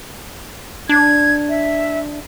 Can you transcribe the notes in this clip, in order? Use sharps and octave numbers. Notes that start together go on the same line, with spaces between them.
D4 G#6
E5